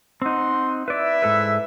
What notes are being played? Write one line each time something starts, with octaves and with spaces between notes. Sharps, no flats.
C4 D#4 F#5 C6
E4 B4 D5 E5
G#2 A4 B4